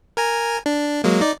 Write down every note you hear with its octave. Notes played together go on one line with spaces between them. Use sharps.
A#4 G#5 A#5
D4
F#3 G#3 A#3
D#4 D5